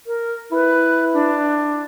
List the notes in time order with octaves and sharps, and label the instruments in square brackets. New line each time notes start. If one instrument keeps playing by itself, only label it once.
[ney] A#4
[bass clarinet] E4 [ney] B4
[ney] D4